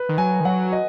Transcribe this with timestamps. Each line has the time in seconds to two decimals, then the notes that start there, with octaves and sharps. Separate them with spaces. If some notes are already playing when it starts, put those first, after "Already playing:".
Already playing: B4
0.09 D#3
0.18 F#3 G#5
0.40 D#3
0.45 F#3 F#5
0.72 D#5